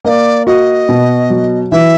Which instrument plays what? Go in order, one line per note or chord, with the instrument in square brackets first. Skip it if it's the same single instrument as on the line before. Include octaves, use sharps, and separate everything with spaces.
[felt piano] A#3 [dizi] D#5
[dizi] D5
[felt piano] F#4 [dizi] D#5
[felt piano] B2
F#3
[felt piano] E3 [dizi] E5